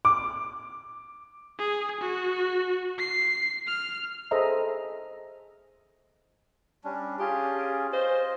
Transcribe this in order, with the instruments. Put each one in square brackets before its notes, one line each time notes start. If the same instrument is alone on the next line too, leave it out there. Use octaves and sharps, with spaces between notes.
[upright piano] D6
[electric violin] G#4
F#4
C7
F6
[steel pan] G#4 A4 C5 D#5 E5 A#5
[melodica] G3 C#4 D4
[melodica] C#4 F4 G#4 [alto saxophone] G4
[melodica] F4 D#5 [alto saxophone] C5